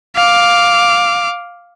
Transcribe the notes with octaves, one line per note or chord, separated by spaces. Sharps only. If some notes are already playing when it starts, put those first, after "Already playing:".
F5 D6